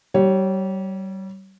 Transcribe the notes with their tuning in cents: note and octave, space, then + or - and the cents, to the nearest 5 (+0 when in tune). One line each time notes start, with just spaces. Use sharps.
G3 -30 C#5 -10